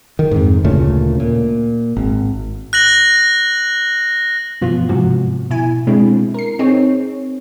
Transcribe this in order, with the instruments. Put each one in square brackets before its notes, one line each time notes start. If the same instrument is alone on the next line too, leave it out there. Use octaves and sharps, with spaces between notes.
[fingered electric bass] D#3
F2 G#2
D2 A#2 C#3 A3
A#2
G#1
[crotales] F#6 A#6 F#7
[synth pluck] G2 B2 E3 F3 B3 F4
G#2 C3 F3 F#4
B2 E4 G#5
B2 G#3 C4 D4 E4
A#4 C7
C4 D#4 G#4 C#5